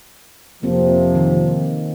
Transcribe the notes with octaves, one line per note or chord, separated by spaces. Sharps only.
F2 C3 F3 A#3 C4
D#3